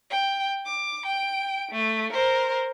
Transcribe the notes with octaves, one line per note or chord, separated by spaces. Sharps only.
G5
D6
G5 D7
A3
A#4 C5